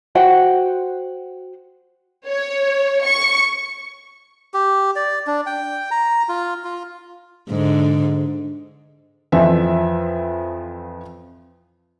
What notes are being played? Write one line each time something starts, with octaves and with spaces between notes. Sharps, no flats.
F#4 C5 F#5 G5
C#5
C#6
G4
D5
D4
G5
A#5
F4
F4
G#2 D3
F2 E3 F3 E5